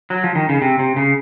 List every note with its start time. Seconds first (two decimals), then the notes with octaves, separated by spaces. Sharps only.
0.10 F#3
0.24 F3
0.35 D#3
0.49 C#3
0.62 C3
0.79 C3
0.96 C#3